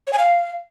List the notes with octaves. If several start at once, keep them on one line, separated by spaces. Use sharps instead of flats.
C#5
G#5
F5